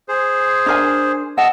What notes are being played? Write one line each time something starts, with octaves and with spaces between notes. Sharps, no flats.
G#4 C5
D4 A#4 G#5
D#5 F#5 A5 E6